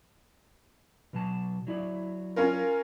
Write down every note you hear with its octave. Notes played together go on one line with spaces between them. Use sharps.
B2 F#3 A5
F#3 E4 D5
C#4 F4 A#4